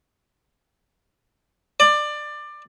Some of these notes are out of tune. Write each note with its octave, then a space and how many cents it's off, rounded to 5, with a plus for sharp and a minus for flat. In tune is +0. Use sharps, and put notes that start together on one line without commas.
D5 +20